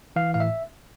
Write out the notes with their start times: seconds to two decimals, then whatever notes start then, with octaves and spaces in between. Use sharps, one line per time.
0.16 E3 F5
0.34 A2 F5
0.40 E5